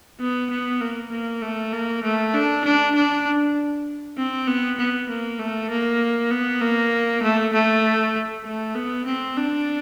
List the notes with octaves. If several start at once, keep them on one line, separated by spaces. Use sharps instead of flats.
B3
B3
A#3
A#3
A3
A#3
A3
D4
D4
D4
C4
B3
B3
A#3
A3
A#3
B3
A#3
A3
A3
A3
B3
C4
D4